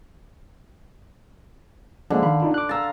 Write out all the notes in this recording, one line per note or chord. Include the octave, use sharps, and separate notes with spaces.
D3 F3 G#3 A#3
D#3 F5 B5
D4 D#4 F4
D6 F#6
F5 A#5 E6 A6